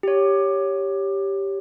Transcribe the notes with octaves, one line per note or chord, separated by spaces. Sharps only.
G4 C#5